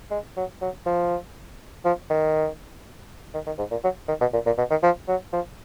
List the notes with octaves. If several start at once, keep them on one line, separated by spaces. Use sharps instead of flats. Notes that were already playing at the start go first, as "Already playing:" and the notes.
G#3
F#3
F#3
F3
F3
D#3
D#3
D#3
G#2
A#2
F#3
D#3
B2
A#2
A#2
B2
D#3
F3
F#3
F3